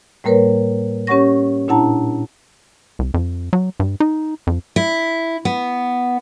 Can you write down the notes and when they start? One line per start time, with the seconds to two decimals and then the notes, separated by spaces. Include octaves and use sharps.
0.24 A2 G3 A#3 A#4 B4 C#5
1.07 C#4 G4 C#5 F#5 C#6 A#6
1.68 A#2 D4 E4 F#5 A5 A#5
2.99 C2
3.14 F2
3.53 F#3
3.80 G2
4.00 D#4
4.47 F2
4.76 E4
5.45 B3